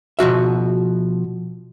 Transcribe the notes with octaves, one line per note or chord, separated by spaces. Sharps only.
B2 F3 F#4 E5